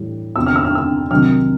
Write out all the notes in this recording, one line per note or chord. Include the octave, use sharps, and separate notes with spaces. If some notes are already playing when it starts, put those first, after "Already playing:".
Already playing: A2 E3 G3
E2 C3 F3 E6
F6
E6
F6
E6
C2 C3 D#3 F#3 F6